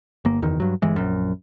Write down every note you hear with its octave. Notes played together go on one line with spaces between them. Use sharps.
G1 A#3
F#1 E2 D#3
G2 F#3
G1 E3 G#3
A#1 F#2